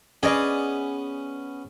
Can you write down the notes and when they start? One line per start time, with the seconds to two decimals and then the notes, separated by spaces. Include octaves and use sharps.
0.23 B3 C#4 G#4 D5 D#5